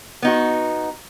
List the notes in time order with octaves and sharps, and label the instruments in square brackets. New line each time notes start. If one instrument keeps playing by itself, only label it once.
[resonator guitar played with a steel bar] B3 D#4 F#4